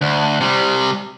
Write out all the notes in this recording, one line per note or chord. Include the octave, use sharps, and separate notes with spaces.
D2
C3 G3